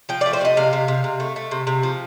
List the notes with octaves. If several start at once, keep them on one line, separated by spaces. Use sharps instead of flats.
F3 G5
A3 D5
C5
C3 D#5
C3 F5
C3
C3
C3
A3
A3
C3
C3
F3